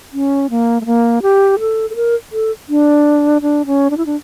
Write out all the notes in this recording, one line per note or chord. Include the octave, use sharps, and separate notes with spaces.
C#4
A#3
A3
A#3
G4
A4
A4
A#4
A4
D4
D4
C#4
D4
E4
D4